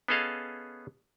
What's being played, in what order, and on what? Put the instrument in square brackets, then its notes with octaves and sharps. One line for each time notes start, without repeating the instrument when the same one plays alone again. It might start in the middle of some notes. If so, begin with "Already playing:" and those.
[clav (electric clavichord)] B3 C#4 G#4 A4 D#5 F5